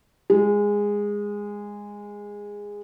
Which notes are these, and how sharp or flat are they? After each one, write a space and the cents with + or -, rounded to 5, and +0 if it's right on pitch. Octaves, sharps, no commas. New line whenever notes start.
G#3 -15